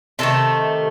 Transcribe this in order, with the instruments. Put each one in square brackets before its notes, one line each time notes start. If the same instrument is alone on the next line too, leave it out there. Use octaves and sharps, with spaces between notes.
[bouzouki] C3 D#3 A3 A4